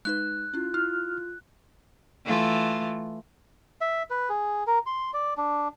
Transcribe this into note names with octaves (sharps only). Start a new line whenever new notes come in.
G#3 D#4 B4 F#6
C#4 E4 F4
E4 F6
E3 A3 F4
E5
B4
G#4
A#4
C6
D5
D4